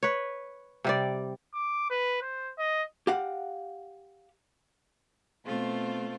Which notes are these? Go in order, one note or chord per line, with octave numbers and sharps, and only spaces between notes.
B4 C#5
C3 G3 D5
D6
B4
C5
D#5
G4 F5 F#5
B2 A3 C4 F4